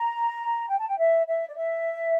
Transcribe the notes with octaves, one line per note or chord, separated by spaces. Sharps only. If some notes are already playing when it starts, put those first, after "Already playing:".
Already playing: A#5
G5
A5
G5
E5
E5
D5
E5